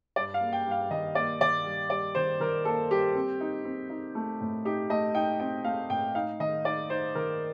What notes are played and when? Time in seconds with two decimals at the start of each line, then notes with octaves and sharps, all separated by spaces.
0.16 G2 D5
0.34 F5
0.41 A#3
0.53 G5
0.66 G2
0.71 F5
0.90 D#3 D#5
1.15 A#3 D5
1.41 D#3 D5
1.65 G3
1.90 G3 D5
2.15 D#3 C5
2.40 D#3 A#4
2.65 A#3 A4
2.91 G3 G4
3.15 C4
3.41 D#4
3.65 C4
3.90 D#4
4.15 A3
4.41 A2
4.65 D#4 G4
4.90 A3 D#5
5.14 D#4 G5
5.40 C4 G5
5.64 A3 F5
5.90 A2 G5
6.15 D#4 F5
6.40 D#3 D#5
6.65 D#4 D5
6.90 D#4 C5
7.15 D#3 A#4